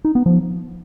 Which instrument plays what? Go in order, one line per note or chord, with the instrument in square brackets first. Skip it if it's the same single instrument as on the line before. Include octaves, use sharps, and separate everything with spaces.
[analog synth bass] D#4
B3
F3